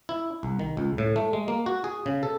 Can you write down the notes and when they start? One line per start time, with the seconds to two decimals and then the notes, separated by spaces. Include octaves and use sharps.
0.09 E4
0.43 C2
0.59 D#3
0.77 C#2
0.98 A2
1.16 A3
1.33 G#3
1.48 A#3
1.66 F#4
1.84 G#4
2.06 C#3
2.23 A4